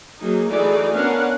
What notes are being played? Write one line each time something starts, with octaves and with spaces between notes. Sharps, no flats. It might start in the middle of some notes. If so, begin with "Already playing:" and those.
F#3 A#3 D#4 G#4
E3 A3 D#4 F#4 G#4 D5
B3 C#4 D4 A#4 F5 F#5